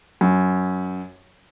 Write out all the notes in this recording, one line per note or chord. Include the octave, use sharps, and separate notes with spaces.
F#2